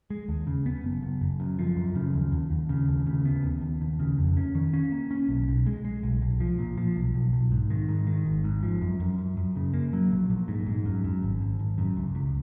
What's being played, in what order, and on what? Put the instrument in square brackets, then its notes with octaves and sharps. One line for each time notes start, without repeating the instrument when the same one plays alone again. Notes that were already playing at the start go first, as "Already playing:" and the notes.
[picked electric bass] G#3
D#2
C#3
B3
F#1
F#1
F#1
F#2
F3
F#2
C#3
D#2
D#2
D#2
C#3
D#2
C#3
B3
D#2
D#2
D#2
C#3
F2
C#4
D#3
C#4
A#3
C#4
B1
B1
G#3
G#3
B1
B1
F3
A#2
F3
B1
B1
B1
G#2
D#3
G#2
D#3
G#1
G#2
F3
F#2
F#2
F#2
F#2
C#3
A#3
F#3
A#1
A#1
G#2
G#2
F#2
F#2
G#1
G#1
G#1
F#2
C#2
C#2